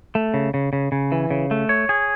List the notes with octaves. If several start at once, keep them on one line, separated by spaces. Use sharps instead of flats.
A3
C#3
C#3
C#3
C#3
E3
C#3
A3
C#5
G#4